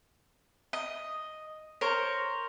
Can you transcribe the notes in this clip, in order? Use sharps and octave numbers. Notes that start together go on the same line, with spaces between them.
D#5
A#4 C5 C#5